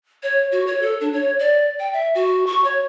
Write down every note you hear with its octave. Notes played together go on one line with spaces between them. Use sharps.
C#5
F#4
C#5
A4
D4
C#5
D5
G5
E5
F#4
C#6
C#5